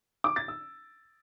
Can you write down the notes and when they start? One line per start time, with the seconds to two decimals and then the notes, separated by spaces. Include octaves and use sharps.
0.24 D6
0.36 A6
0.48 E6